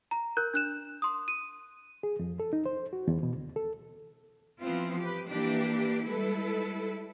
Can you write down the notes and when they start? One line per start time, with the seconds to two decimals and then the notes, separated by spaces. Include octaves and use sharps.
0.11 A#5
0.37 A#4 F#6 G6
0.54 D4 F#6 E7
1.02 C6 D#6
1.28 D#7
2.03 G#4
2.19 F2
2.40 A4
2.53 D#4
2.66 C5
2.93 F#4
3.07 E2
3.23 B2
3.35 D2
3.56 A4
4.62 E3 F3 B3 C4 F4
5.01 G4 B4
5.31 E3 A#3 D4 G4
6.07 G3 G#3 E4 A4 B4